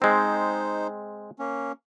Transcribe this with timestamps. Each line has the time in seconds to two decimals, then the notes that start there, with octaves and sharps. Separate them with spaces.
0.02 G#3 C4 D#4 C5
1.39 A#3 C#4